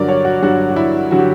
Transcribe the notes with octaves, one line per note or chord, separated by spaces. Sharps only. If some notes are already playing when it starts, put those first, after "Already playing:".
Already playing: G2 D3 F#3 A#4 D5
C#5
F#4
G2 D3 F#3 F#4
F#4
E4
D3 F#3 F#4
G4